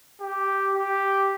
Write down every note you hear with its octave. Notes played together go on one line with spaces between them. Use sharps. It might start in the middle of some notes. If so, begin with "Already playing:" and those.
G4
G4